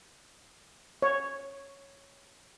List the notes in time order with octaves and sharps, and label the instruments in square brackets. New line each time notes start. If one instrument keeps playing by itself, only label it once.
[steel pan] C#5